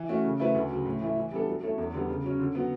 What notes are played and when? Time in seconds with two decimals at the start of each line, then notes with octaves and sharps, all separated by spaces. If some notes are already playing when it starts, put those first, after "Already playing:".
Already playing: E3
0.09 A3 C#4 F#4
0.24 C#3
0.39 F#3 A3 E4 B4
0.55 D2
0.70 C#3 F#3
0.85 A2
1.01 E3 A3 E4
1.16 E3
1.31 G3 B3 D4 A4
1.47 F#3
1.62 A3 E4 A4 C#5
1.78 E2
1.93 D3 G3 B3
2.09 C#3
2.24 F#3 C#4
2.39 D3
2.55 F#3 B3